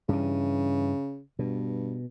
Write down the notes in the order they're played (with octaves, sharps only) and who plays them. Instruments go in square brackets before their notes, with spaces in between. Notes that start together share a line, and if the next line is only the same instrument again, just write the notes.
[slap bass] G2 E3 [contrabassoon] C#3
[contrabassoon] G2 [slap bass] B2